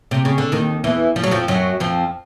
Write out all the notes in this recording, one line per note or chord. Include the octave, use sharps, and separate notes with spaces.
C3
C#3
D3
D#2 D#3
E2 E3
F3
F#3
F2 F3
F#2 F#3
F2 F3